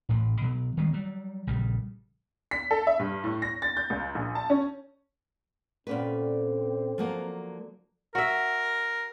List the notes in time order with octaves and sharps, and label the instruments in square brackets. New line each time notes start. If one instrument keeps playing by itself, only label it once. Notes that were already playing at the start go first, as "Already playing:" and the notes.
[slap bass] A1 A2
B2 F#3
D#3 G3 G#3 B3
F#3 G3
A#1 C#3 G3
[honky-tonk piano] B6
A4
E5
G2
A2
A#6
A6
G6
C#2
A#1
A5
C#4
[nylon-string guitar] A#2 C#4 B4 [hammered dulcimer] D3 G5 D6 [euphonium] C4
[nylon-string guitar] F3 F#3 A#3
[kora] F#4 E5 [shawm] A#4